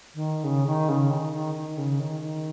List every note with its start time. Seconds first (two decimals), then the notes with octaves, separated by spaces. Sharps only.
0.15 D#3
0.44 C#3
0.67 D#3
0.89 C#3
1.10 D#3
1.33 D#3
1.55 D#3
1.77 C#3
2.00 D#3
2.21 D#3